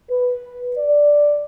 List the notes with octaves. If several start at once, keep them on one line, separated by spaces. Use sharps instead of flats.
B4
D5